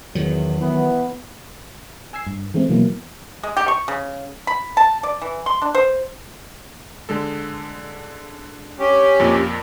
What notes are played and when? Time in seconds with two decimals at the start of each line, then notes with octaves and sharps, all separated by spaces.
0.15 E2 D#3 F#3
0.59 E3 B3
2.13 G#5 E6 G#6 C7
2.27 G2
2.54 E3 G#3 A3 C4
2.69 B2 E3 F#3 A#3 E4
3.43 G#3
3.57 G4
3.68 C#6
3.88 C#3
4.47 B5
4.77 A5
5.03 D5
5.22 E3
5.46 C6
5.62 D4
5.75 C5
7.09 D3 G#3 A4
8.79 C#4 G4
9.20 F2 A#2